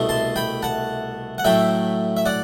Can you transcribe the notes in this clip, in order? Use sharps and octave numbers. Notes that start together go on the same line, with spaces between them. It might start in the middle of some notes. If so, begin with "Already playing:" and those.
Already playing: C2 B2 A3
A5 C6
G5 B5
F#5 A5
F#5
A2 F#3 A3 E5 G5
E5
D5 F#5